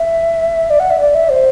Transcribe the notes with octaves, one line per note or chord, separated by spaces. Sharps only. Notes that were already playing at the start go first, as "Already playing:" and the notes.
Already playing: E5
D5
F#5
E5
D5
E5
C5